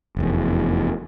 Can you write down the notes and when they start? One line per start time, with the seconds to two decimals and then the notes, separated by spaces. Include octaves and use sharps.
0.17 F1 E2